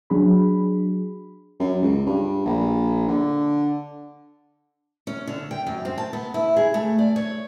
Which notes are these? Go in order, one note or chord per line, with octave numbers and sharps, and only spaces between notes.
F#3 D4 F#4 G#4 B5
F#2
C#2
G2
A#1
D3
C#4
D3
G5
F#2
C4
A5
B3
E4
G#4
A3
D5
C#5